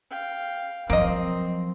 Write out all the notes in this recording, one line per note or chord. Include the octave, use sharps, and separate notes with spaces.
F5 G5
F3 F#3 A#3 C4 D#5